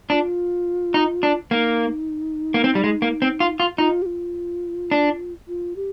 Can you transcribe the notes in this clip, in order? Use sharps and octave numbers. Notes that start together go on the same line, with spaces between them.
D4 F4
D#4
D4
A#3 D#4
A#3
C4
G3
G#3
A#3
C4
F4
F4
D#4 F4
G4
F4
D4
F4
G4